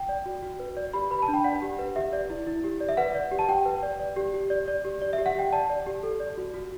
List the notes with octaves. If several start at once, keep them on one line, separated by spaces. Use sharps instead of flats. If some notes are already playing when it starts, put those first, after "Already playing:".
Already playing: G5
D5
F#4
F#4
B4
D5
G4 B5
B4 B5
A5
D4
G5
D5 F#5
G4
B4
G4 E5
D5
E4
E4
G4
D5
E5
B4 F#5
D5
G4
A5
G4 G5
B4
D5
D5
G4
G4
D5
D5
G4
D5
E5
G4
F#5
G4 G5
D5 A5
D5
G4
A4
D5
F#4
F#4